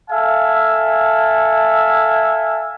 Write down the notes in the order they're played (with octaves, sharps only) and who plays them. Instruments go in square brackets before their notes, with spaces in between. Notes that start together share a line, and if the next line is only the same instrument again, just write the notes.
[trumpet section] A4 E5 F5 G#5